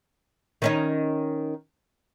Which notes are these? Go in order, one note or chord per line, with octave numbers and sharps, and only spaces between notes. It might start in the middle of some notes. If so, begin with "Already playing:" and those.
D#3 C#4 D#4